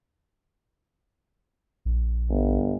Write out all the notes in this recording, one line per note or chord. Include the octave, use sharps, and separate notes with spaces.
A#1
G1